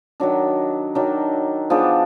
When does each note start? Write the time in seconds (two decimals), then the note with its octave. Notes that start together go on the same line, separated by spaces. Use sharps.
0.20 D#3 F#3 D4
0.95 D#3 F#3 D4
1.70 F3 B3 D4 G#4